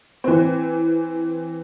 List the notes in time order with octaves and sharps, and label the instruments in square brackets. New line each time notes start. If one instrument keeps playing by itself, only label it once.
[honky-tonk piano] E3 C4